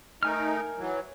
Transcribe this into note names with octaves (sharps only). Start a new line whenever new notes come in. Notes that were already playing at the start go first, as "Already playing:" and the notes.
A3 D#4 A#4 G#5 F6
E3 F#3